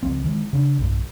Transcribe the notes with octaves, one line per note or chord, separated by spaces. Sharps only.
C#2 F3 C4
D#3 E3 F#3 G#3
C#3 D4
B1 G2